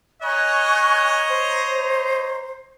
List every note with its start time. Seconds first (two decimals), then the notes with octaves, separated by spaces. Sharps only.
0.22 C#5 D#5 G#5 A#5 C#6 F#6
1.28 C5